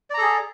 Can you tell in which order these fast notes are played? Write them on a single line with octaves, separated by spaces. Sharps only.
D5 A#5 A4 G#4